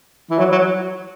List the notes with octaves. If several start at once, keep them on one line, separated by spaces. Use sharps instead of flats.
E3
F#3
F#3